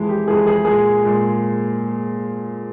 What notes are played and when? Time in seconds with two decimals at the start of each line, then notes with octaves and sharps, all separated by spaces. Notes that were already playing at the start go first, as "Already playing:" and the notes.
Already playing: F2 E3 G#3
0.09 G4
0.28 F2 E3 G#3 G#4
0.47 G#4
0.65 A#2 G#3 G#4
1.03 A#2 G#3